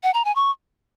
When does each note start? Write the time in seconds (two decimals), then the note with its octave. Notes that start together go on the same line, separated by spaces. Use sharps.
0.03 F#5
0.14 A#5
0.25 G#5
0.36 C#6